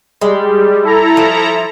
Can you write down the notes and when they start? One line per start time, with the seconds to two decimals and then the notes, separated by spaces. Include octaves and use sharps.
0.21 G3 G#3
0.83 E4 A4 A#5
1.17 F3